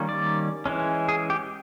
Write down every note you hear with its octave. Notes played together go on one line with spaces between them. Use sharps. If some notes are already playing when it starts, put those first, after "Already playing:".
Already playing: D#3 G3 A#3 C#4
D5
E3 G#3 C#4
G#4
G4